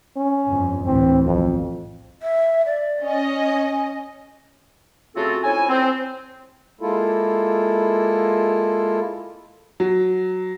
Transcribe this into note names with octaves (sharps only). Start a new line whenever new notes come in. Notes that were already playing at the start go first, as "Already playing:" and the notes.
C#4
G1 F2
D2 A2 E3 C4
B1 F2
E5
D5
C#4 D#5
G#5
C#3 A3 C4 F4 F#4 A4
F2 C#4 E4 G#5
C4
G#3 A#3 E4 F4 A4
F#3